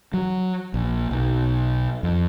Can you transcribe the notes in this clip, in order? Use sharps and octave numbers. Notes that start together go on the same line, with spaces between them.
F#3
A#1
B1
F2